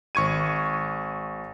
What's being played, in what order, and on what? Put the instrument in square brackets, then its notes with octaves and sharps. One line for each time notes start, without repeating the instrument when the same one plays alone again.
[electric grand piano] G#1 C#6 G#6 D#7